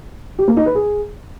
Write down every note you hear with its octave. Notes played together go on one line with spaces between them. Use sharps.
G4
A#3
D#4
B4
G#4